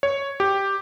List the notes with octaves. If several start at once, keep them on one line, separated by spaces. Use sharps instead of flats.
C#5
G4